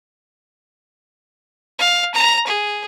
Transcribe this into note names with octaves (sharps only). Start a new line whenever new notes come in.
F5
A#5
G#4